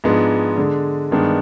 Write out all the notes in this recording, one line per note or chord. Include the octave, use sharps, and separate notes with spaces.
G#2 F3 G#3 B3 D4
D3 G#3 D4
G2 D#3 G#3 B3 D4